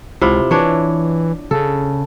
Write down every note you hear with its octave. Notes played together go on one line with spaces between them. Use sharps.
C#2 C3 E4 F4
E3 D4 C#5
C#3 A4